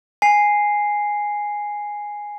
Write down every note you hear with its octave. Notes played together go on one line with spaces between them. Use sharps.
G#5 C7